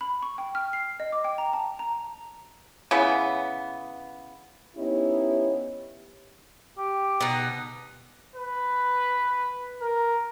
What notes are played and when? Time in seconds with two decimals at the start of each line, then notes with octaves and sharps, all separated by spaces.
0.01 B5
0.23 C#6
0.38 G5
0.55 F6
0.73 C7
1.00 D#5
1.12 D6
1.24 G5
1.38 A#5
1.53 A5
1.79 A#5
2.91 C#3 E3 B3
4.77 B3 C#4 D#4 E4 G4 C#5
6.78 G4
7.21 B2 D#4
8.36 B4
9.81 A#4